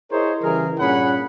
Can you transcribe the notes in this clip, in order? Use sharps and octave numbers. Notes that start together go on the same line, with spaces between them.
E4 G#4 A#4 C5 C#5 D#5
C#3 E3 G3 G#4 A#4
G2 A#2 C#4 G#4 F#5 B5